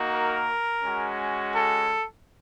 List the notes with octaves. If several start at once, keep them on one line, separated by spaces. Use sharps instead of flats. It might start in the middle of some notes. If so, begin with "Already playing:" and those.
Already playing: A#3 D#4 F#4
A#4
G#3 C#4 F#4
A4